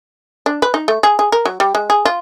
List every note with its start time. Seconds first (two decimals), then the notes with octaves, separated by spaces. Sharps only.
0.46 D4
0.62 B4
0.74 D#4
0.88 A3
1.03 G#4
1.19 G#4
1.32 A#4
1.45 F#3
1.60 G3
1.75 G#3
1.90 G#4
2.05 F4